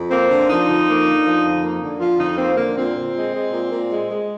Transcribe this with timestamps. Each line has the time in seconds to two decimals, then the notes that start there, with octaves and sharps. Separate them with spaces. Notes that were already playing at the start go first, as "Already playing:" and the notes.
Already playing: F2
0.10 A#3 C4
0.30 D3
0.48 F3 D#4
0.68 F2
0.87 A#3
1.05 D3
1.25 F3
1.43 F2
1.62 A#3
1.81 D3
2.00 F3 F4
2.19 F2 D#4
2.38 A#3 C4
2.56 D3 A#3
2.76 A#2 C4
2.95 A#2
3.14 G#3
3.32 G#3
3.52 A#2
3.71 A#2
3.90 G#3
4.09 G#3